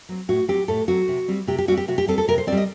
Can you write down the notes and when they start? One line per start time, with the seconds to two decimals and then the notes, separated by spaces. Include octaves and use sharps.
0.09 F#3 C4
0.28 A2 F#4
0.48 F#3 C4 G4
0.68 A2 A4
0.88 F#3 C4 F#4
1.08 C3
1.28 G3 C4
1.47 C3 G4
1.58 G4
1.68 G3 F#4
1.72 C4
1.77 G4
1.88 C3 F#4
1.98 G4
2.07 G3 C4 A4
2.18 A4
2.28 C3 A#4
2.38 C5
2.47 C4 D5
2.52 G3
2.57 D#5